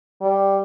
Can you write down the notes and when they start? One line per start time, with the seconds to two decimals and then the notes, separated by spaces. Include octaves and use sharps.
0.21 G3